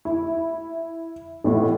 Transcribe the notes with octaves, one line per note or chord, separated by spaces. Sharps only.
E4
A1 A2